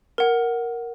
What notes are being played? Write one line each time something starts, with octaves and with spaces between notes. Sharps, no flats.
A#4 F#5